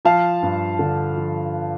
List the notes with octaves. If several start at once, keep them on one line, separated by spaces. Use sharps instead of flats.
F3 F5 A5
G2
D3
F3